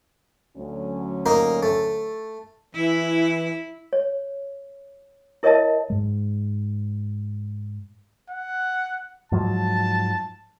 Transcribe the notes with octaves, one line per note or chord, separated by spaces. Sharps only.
D2 F#3 C#4
A#3 D#4 A#4
A3
E3 E4
C#5
E4 A#4 C#5 D#5 E5 A5
G#2 G#3
F#5
G#2 F3 F#3 A5